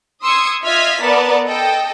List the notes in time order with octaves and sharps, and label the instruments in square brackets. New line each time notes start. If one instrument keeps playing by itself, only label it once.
[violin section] C6 D#6 E6 G#6 C#7
F4 D#5 E5 F6 G#6 B6
B3 A#4 D5 F#5 A5
A4 D#5 G5